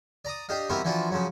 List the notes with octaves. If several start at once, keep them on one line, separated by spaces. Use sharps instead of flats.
D5 A#5 D6 D#6
D4 G4 D#5 F5
B2 E3 G3 C4 G4 A#4
E3 F3 D4 F4 F#4
C#3 F3 F#3